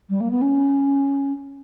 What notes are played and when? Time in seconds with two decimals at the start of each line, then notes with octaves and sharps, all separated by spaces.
0.09 G3
0.20 A#3
0.30 B3
0.41 C#4